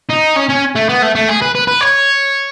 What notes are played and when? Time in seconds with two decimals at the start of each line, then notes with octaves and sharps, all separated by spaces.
0.10 D#4
0.37 C#4
0.50 C#4
0.76 A3
0.89 B3
1.02 A3
1.15 A3
1.29 G#4
1.42 B4
1.55 B4
1.68 B4
1.81 C#5